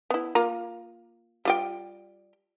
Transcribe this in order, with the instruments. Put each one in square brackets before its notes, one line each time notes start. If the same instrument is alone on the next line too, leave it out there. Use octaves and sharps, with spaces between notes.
[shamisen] B3 E4
A#3 F4 A#5
G3 F4 G5